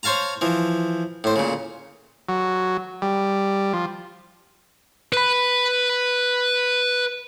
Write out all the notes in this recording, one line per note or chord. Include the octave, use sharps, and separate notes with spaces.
C5 C#5 F5 A5 A#5
E3 F3
A2 C5
A#2 C#3
F#3
G3
F3
B4 B5